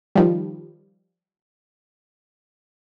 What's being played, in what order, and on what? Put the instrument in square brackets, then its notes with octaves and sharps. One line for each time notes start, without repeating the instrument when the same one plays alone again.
[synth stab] D#3 F3 G3